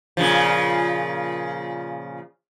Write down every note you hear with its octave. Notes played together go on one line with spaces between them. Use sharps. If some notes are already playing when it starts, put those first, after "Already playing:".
A#2 C#3 F3